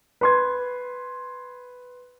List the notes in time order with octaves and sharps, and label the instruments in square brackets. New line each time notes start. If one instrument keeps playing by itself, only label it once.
[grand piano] B4 C6 G#6